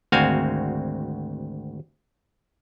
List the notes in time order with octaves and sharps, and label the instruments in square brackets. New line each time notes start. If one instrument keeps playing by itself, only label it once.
[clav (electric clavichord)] G#1 D2 C4 F#4 F5 G#5